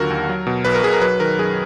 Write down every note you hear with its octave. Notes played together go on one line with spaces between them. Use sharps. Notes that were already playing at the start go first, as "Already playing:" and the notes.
Already playing: D#2 D3 F#3 F4 F#4 A#4
D#2
F#3
B2
B1 B4
A#4
B1 G#4
A#4
F#3 B4
D#3 A#4
F#2 G#4